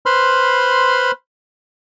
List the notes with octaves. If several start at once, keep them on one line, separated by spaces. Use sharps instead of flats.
B4 C5 B5 C6 F6